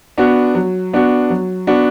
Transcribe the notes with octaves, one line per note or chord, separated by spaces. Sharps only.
B3 D4 F#4
F#3
B3 D4 F#4
F#3
B3 D4 F#4